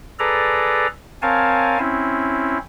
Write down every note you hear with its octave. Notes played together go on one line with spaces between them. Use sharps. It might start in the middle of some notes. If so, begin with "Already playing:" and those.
G#4 A4 B4 D5 A#5
C4 A#4 C#5 F5 G#5 A5
C4 C#4 E4